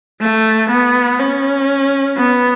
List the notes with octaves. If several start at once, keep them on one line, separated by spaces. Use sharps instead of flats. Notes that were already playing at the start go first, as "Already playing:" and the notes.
A3
B3
C#4
B3